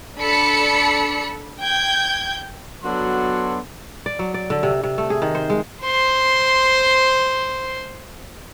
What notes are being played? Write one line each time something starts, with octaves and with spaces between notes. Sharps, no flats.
D4 A4 B5 C#7
G5 G6 G#6
F#3 B3 D4 F#4 A4 C6
D5
F#3
D5
D3
C3
C3
A3
G#4
D#3
C5
G#3
C5 C6